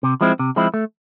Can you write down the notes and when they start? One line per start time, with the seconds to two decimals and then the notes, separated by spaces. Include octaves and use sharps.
0.03 C3
0.21 F3 G#3 C4 E4
0.39 C3
0.56 F3 G#3 C4 E4
0.74 A3